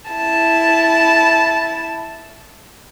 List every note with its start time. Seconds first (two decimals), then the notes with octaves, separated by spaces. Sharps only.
0.11 E4 A5